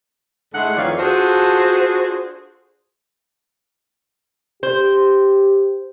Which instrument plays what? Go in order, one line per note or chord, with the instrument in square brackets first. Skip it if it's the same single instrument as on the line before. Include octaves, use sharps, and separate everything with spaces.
[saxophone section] G#2 D3 G#3 A3 E4 F#5
F2 D#3 E3 C#5 D5 F5
D4 F4 F#4 G#4 A4 C5
[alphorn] G4 [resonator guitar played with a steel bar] C5